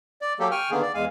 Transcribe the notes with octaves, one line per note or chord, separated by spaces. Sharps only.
D5
F#3 A#3 G4 A4
G5 G#5 C#6 F6
D3 D#3 A#3 B3 G#4
D5
E2 G#3 F5 G#5